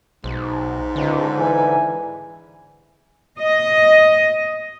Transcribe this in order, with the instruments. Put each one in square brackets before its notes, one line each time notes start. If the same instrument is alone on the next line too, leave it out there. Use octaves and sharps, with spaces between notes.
[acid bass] B1 [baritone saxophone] G#2
[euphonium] C#2 [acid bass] D3
[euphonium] E3 [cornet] G#5
[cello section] D#5